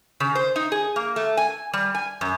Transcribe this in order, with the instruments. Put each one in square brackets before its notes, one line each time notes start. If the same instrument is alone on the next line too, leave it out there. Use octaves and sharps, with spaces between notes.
[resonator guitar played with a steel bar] C#3
C5
D#4
G#4
A#3
A3
G#5
G3
G#5
F#2